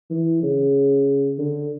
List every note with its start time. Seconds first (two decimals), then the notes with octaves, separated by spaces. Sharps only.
0.10 E3
0.43 C#3
1.39 D3